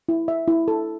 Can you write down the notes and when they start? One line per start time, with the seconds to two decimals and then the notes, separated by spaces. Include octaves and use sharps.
0.09 E4
0.28 E5
0.48 E4
0.68 A4